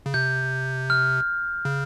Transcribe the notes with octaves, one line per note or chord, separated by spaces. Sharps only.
C#3
C3 G6
F6
C#3